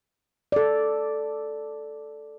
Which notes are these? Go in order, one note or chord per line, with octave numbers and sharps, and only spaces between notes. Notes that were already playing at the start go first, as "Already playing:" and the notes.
A4 D5